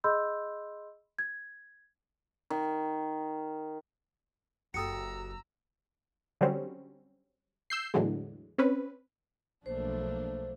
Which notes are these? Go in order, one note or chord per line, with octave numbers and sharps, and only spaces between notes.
G#4 D#5 B5 C6 E6 G6
G#6
D#3
F#1 F#4 G4 A4 A#5 D#6 E6 C#7
D3 F#3 G3 C4 C#4
E6 G6 C7
E2 A2 D3 E3 F#3 G#3
C4 C#4 B4
B1 F3 A3 A#3 D4 C5